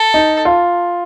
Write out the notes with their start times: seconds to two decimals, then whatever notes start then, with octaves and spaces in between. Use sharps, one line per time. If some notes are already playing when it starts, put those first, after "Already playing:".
Already playing: A4
0.14 D#4
0.45 F4